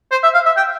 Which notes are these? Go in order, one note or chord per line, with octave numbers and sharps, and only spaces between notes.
C5
E5
F5
E5
G5